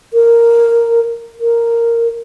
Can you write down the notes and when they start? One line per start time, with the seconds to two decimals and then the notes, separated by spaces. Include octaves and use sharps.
0.14 A#4
1.40 A#4